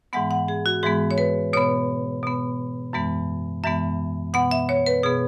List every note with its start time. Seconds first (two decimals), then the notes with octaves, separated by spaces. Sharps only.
0.13 G#2 E3 G#3 B3 F#5
0.31 F#5
0.48 G#4
0.66 F#4
0.83 G#2 E3 G#3 B3 G#4
1.11 C#5
1.18 B4
1.53 B2 B3 C#5
2.23 B2 B3
2.93 F#2 E3 G#3 B3
3.64 F#2 E3 G#3 B3 E5
4.34 B2 B3 F#5
4.51 E5
4.69 C#5
4.86 B4
5.03 B2 B3 G#4